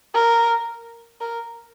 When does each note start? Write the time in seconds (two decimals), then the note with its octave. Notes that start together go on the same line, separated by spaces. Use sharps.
0.14 A#4
1.21 A#4